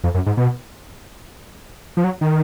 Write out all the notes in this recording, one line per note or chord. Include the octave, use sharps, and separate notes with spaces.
F2
F#2
G#2
B2
F3
F#3
D#3